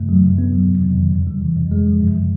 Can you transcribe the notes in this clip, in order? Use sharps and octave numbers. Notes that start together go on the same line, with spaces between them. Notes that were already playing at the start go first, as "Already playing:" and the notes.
Already playing: F#2 A3
F#3
F#2
B3
F#3
F2
F2
D#3
E2
G3
E3
F2
G#3
F3
F#2